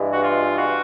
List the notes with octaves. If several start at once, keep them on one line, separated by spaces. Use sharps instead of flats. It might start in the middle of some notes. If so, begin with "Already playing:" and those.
Already playing: G2 E3 G#3
F#4
F4
F#4